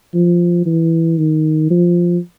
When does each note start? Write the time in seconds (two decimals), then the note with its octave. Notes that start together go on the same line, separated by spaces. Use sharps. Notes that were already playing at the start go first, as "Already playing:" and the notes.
0.14 F3
0.66 E3
1.18 D#3
1.70 F3